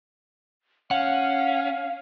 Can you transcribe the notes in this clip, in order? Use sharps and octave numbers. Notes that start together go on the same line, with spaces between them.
C#4 F5 F#5